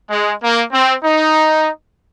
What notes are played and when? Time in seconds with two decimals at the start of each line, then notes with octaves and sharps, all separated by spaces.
0.11 G#3
0.42 A#3
0.73 C4
1.04 D#4